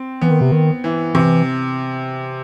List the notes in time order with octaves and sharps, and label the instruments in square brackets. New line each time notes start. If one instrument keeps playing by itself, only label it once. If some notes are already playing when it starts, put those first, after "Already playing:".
Already playing: [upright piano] C4
[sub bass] E3 [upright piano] B3
[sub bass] D#3
C3
D#3
[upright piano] E3
[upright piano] C3 [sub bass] E3